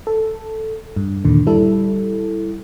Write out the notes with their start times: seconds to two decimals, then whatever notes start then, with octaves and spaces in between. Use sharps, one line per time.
0.07 A4
0.96 G2
1.25 D#2 A#2 D3
1.47 G3 E4 A4